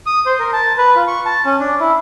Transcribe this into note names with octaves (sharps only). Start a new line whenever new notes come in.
D#6
C5
A#4
A5
B4
F4
C#6
A5
C#4
D4
E4